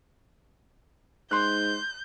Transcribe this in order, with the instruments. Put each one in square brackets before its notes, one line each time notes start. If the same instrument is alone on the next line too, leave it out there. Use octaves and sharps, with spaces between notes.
[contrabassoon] G#2 [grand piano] C6 F#6 [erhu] G6